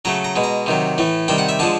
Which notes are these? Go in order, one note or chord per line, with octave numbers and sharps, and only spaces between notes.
C#3 F#3 A3 A#5
A#5
B2 G#3
A#5
C3 D#3 F#3
A2 E3 A3
C3 D#3 G3 G5
F#5
E5
D3 F3 G#3 A5